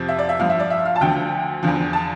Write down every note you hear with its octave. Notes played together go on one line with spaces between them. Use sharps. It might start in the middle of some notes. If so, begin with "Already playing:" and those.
Already playing: F2 C3 F3
E5
D5
E5
G2 F3 F5
E5
D5
E5
F5
A5
D2 D3 F3 G5
E2 D3 F3
A5